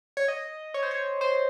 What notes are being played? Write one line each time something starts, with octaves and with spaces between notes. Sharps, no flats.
C#5
D#5
C#5
C5
C#5
C5